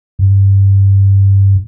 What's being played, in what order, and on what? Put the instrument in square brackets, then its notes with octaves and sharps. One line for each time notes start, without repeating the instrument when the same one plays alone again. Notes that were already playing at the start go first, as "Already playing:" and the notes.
[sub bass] G2